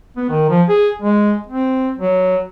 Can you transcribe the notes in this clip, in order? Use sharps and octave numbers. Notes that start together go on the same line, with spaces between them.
B3
D#3
F3
G#4
G#3
C4
F#3